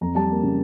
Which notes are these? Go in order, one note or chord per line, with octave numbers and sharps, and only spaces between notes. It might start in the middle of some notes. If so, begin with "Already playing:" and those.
F2 A#5
G3 A5
A#3
C#3